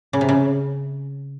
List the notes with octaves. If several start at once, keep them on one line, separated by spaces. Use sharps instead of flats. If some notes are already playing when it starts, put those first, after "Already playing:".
C#3
C3
C#3